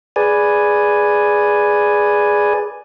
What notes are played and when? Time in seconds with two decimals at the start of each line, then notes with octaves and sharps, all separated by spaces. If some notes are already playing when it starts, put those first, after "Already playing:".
0.16 G#4 B4 D5 G#5